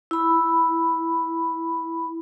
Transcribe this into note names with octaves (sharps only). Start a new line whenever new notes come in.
E4 B5